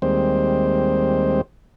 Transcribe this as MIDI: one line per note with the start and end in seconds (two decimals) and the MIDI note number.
0.02 1.41 39
0.02 1.41 55
0.02 1.41 56
0.02 1.41 60
0.02 1.41 72